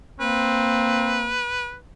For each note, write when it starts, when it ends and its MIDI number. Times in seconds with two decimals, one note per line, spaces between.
0.20 1.41 58
0.20 1.30 60
0.20 1.76 71